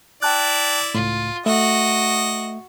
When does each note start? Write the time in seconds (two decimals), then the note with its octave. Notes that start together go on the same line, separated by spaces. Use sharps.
0.23 E4 D5 G5 A5 F#6
0.94 C#2 A2 F4
1.46 A3 F#4 D#5 E5